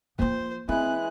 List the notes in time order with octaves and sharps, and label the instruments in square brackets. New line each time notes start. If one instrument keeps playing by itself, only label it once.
[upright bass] F3 F4 [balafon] A#3 [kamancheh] C5
[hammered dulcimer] E3 E4 [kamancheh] G#3 F#6 [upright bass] C4